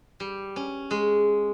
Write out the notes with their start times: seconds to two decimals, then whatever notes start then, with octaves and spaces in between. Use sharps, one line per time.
0.20 G3
0.56 C#4
0.91 G#3